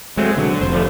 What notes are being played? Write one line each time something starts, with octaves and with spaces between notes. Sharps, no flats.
F#3 G#3 A3 C4
B1 D3 F#3
F1 C5
D3 F3 A3